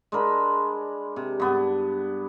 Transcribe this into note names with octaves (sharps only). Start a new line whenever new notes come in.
G#3 D4 A#4 B5
C3
G2 B3